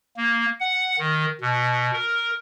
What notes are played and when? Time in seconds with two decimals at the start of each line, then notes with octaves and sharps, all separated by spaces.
0.17 A#3
0.60 F#5
0.99 D#3
1.41 B2
1.93 A#4